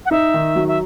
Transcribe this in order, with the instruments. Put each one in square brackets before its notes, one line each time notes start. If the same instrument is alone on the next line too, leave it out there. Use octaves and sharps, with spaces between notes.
[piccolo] F#5
[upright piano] D#4 [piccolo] E5
[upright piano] D#3
F#3
[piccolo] E5